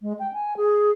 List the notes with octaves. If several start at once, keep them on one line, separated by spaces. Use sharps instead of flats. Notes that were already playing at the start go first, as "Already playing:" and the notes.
G#3
G5
G#5
G#4